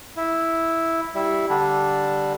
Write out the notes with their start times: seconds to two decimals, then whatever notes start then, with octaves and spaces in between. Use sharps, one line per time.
0.17 E4
1.15 G3 E4
1.49 D3 G3 D4